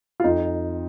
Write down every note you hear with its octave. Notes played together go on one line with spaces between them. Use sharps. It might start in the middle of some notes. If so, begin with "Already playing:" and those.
F4
F2 D#4